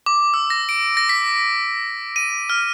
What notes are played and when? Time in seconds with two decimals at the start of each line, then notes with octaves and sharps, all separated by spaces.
0.06 D6
0.34 E6
0.50 A#6
0.69 D7
0.97 A#6
1.09 B6
2.16 D#7
2.50 F6